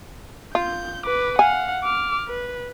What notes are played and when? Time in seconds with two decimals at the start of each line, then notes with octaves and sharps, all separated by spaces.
0.55 F4 G6
1.06 B4 D6
1.39 F5 F#5 G#5
1.84 D6 F6
2.28 B4